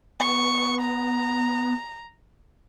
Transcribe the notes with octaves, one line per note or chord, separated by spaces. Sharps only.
B3 C#6
A#5